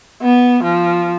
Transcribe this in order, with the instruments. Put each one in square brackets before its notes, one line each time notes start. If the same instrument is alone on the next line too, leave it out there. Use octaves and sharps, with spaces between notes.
[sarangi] B3
F3